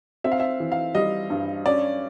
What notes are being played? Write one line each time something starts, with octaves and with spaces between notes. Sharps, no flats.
C4 E5
F5
E5
E3
F5
G3 D#5
G2
C#4 D5